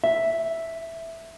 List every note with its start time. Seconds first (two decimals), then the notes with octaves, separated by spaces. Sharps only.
0.04 E5